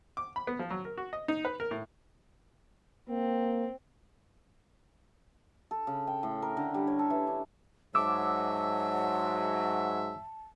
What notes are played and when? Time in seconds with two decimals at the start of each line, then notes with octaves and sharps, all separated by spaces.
0.17 D6
0.36 B5
0.47 B3
0.59 F3
0.70 F#3
0.85 A#4
0.98 F#4
1.13 D#5
1.28 D#4
1.45 B4
1.60 A#4
1.71 A2
3.10 A#3 C4
5.71 A4
5.87 C#3
6.07 G5
6.23 A2
6.42 A#4
6.57 D3
6.74 G3
6.87 C#5
6.99 A4
7.10 E3
7.27 D4
7.95 G#2 F#3 E5 A5 D6 E6